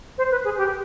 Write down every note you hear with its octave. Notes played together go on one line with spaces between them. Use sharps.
C5
B4
G#4
G4